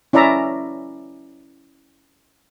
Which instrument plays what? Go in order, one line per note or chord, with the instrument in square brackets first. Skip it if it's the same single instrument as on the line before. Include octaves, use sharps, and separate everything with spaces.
[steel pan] C#4 E4 D5 E5 A#5